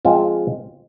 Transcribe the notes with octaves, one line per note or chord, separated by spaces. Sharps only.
F3 G#3 C4 F4